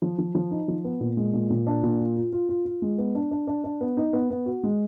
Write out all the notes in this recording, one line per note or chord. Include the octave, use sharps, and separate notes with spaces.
F3
F3
F3
D#4
F3
B3
A#2
G#3
A#2
A#2
D4
A#2
F4
F4
F4
F4
F4
G#3
B3
D4
D4
D4
D4
B3
D#4
B3
B3
F#4
G#3